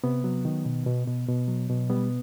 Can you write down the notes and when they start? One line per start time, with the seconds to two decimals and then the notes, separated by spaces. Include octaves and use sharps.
0.04 C3 B3
0.24 F#3
0.45 D#3
0.65 B2
0.86 B2
1.07 B2
1.28 B2
1.48 F#3
1.70 B2
1.90 G3 B3